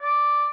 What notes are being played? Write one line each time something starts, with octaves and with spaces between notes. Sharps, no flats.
D5